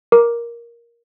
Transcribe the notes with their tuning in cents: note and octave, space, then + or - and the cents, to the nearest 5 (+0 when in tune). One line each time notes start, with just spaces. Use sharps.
A#4 +10 D6 +0